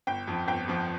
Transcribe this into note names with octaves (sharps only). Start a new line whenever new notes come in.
G1 G5
F2 F3
G1 G5
F2 F3